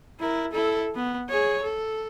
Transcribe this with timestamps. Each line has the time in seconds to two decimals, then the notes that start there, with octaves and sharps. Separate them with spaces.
0.20 E4 A#4
0.52 E4 A4
0.95 B3
1.29 G#4 C#5
1.63 A4